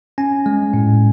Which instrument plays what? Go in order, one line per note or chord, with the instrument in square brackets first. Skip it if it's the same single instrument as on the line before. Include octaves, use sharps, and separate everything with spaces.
[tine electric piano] C#4 G#5
G#3
A2